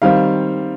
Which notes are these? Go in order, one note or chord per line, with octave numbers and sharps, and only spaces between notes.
D#3 G3 C4 F5